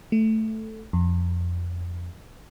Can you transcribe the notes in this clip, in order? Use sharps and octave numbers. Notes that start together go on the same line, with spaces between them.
A3
F2